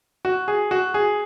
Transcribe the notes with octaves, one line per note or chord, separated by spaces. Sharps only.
F#4
G#4
F#4
G#4